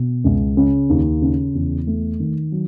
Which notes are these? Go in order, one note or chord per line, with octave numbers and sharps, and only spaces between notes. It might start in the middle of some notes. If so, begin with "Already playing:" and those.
Already playing: B2
C#2
C#3
D#2
C#3
E2
A3
D#3
F#3